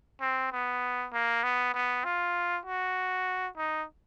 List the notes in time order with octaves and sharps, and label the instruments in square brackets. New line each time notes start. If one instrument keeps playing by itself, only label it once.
[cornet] C4
B3
A#3
B3
B3
F4
F#4
D#4